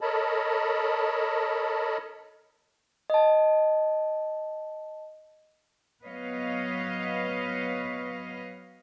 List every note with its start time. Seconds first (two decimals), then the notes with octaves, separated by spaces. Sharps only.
0.01 A4 A#4 C#5 D#5 A5 B5
3.10 D#5 A5
6.04 F#3 B3 B4 C#5 D#5 F5